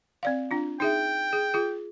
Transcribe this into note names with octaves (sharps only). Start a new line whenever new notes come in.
C4 D5 F5
D4 F4
D#4 G#4 E5 G5
G#4
F4 G#4